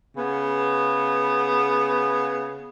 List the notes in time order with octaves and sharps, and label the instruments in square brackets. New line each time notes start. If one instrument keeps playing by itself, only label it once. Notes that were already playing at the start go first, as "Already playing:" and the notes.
[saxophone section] C#3 B3